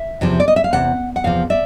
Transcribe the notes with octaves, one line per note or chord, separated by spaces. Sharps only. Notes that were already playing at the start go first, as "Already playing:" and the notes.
Already playing: E5
E2 C3 F3
D5
D#5
E5
F5
E2 C3 F#5
F#5
E2 C3 F3 F5
D5 E5